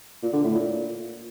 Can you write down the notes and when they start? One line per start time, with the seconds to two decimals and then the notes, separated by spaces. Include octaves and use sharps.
0.22 A#2
0.33 D3
0.43 A2
0.54 A#2